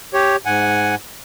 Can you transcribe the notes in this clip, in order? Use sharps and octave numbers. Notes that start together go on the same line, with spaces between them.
G4 C#5
G#2 F#5 G#5